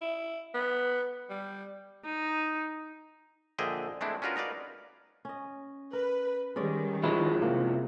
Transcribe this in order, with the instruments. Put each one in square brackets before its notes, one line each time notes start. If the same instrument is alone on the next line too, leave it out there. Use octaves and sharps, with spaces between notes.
[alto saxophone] E4
B3
G3
[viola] D#4
[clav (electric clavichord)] A#1 D3 G#4 D#5 E5 G5
G#3 A3 C4 D4 E4
C#4 D4 F4 F#4 A#4 B4
D#4 A#4 B4 D5 F5
[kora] C#4 D#5
[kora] A#4 [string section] B4
[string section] D#3 G3 [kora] G#3 C#4 D5
[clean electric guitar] F3 G#3 E4 [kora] F#3 F#4 B4
[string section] C3 [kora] A#3